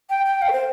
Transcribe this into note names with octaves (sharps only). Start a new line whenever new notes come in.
G5
G5
F5
A4
C5